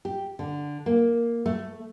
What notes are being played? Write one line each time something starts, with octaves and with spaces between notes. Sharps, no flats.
G4
D3
A#3
A3